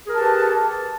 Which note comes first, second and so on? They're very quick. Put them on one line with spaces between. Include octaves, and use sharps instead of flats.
G#4 A#4 G4 A5 B4